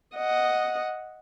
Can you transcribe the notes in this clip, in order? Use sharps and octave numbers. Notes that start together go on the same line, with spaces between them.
D#5 F#5